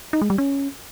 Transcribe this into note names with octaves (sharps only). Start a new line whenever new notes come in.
D#4
G#3
G3
C#4